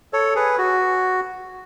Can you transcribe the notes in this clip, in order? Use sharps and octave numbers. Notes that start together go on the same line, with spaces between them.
A4 C#5
G#4 B4
F#4